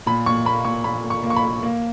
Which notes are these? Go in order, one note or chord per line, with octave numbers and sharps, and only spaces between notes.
A#2 B5
A#2 C#6
A#3 B5
A#2 C#6
A#2 B5
A#3
C#6
A#3
C#6
B5
A#3
A#3